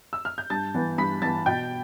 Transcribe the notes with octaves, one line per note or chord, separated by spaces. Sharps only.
E6
F6
G6
G2 A5 A6
E3 B3
G2 B5 B6
E3 B3 A5 A6
B2 G5 G6